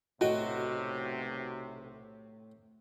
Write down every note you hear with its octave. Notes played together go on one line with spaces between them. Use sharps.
B1 A2 C3 F#4 D#5 G5